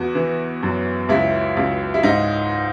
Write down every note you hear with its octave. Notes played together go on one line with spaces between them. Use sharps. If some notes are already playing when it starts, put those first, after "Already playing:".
Already playing: E2 F#4
E3
F#2
C#2 E4
C#2
E4
G#2 D#4